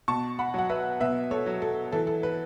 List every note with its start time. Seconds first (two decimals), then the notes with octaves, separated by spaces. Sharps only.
0.08 B2 A5 C#6
0.39 F#5 B5
0.54 F#3 F#5
0.70 B4 E5
1.00 B2 B4 E5
1.31 A4 C#5
1.46 F#3
1.62 A4
1.92 E3 A4
2.07 A4
2.23 B4